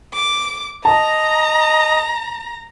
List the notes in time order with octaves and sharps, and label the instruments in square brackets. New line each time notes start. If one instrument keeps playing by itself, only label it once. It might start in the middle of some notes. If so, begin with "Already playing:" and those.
[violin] D6
[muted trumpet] D#5 [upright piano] A5 [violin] A#5